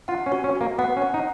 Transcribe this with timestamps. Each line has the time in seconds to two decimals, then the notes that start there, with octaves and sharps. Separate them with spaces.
0.08 F4 F#5
0.26 C#4
0.32 F#4
0.44 C#4
0.55 F#4
0.61 A#3
0.79 B3 F#5
0.97 C#4
1.02 F#5
1.14 D#4